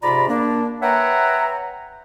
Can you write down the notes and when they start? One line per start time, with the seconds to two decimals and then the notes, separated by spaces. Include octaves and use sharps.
0.03 G#2 C3 F4 D5 A#5 B5
0.28 A#3 D4
0.82 B4 C#5 E5 F#5 G5 A#5